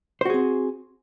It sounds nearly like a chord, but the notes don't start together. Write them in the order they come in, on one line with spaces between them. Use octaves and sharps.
C5 F#4 G#4 C4